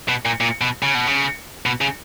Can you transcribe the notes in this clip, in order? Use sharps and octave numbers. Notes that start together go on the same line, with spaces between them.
B2
A#2
A#2
B2
C#3
B2
C#3
B2
C#3